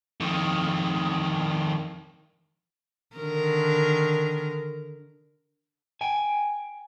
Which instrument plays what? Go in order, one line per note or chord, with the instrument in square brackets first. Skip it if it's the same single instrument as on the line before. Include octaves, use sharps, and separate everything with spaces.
[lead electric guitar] F2 D#3
[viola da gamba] D3 D#3 A#4
[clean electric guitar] G5 G#5